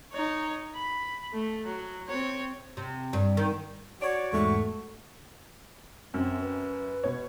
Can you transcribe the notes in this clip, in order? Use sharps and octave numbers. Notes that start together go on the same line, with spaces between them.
D#4 C#5
B5
A3
F#3
C4 C#5
C3
G2
D#3
F#4 C#5 D5
E2 G#2 A3 C#6
F#2 C4
B4
B2 C#5